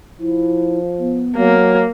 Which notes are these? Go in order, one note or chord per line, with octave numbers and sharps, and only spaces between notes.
F3 E4
B3
F#3 A#3